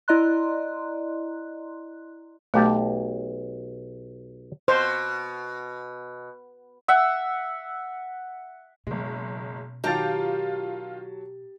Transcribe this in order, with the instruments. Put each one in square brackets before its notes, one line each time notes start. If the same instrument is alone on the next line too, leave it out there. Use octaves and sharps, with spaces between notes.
[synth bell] E4 D5 D#5 A#5 C6 F#6
[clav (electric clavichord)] B1 G4 A5 [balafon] A3
[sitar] B2 [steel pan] C5
[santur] E5 F#5 E6
[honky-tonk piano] F#1 G#3 [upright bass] B2
[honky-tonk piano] D#3 F4 [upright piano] F#3 A5 A6 [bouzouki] G4 A#5